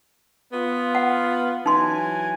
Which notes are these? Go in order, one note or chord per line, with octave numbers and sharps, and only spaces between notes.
B3 F4
F#5
E3 F#3 D#4 G#5 C6